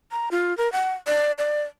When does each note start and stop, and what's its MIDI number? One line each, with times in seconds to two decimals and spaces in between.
0.11 0.29 82
0.31 0.56 65
0.58 0.71 70
0.72 0.94 78
1.07 1.32 74
1.38 1.62 74